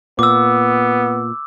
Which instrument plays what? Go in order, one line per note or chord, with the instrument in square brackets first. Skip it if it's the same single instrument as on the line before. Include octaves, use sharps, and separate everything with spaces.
[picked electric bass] A#2 [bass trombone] B3 [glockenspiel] D6 E6